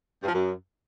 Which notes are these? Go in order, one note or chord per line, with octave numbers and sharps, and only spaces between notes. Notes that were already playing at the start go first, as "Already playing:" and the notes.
G2
F3
F#2